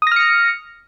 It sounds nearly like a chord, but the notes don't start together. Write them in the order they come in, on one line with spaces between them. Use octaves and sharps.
D#6 A#6 F6 C#7